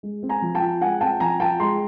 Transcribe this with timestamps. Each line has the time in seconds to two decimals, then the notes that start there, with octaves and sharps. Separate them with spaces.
0.03 G#3
0.23 C4
0.29 G#5 A#5
0.42 F3
0.55 G5 A5
0.62 F4
0.81 G#3 F#5 G#5
1.01 C4 G5 A5
1.20 F3 G#5 A#5
1.40 F4 G5 A5
1.60 G#3 A#5 C6